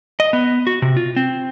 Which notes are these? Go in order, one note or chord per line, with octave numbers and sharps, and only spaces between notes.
D#5
B3
F#4
C3
F4
C4